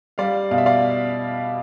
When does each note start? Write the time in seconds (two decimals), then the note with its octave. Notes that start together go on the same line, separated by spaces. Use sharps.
0.18 G3 D5 F5
0.51 B2 F5
0.58 E5
0.66 D5 F5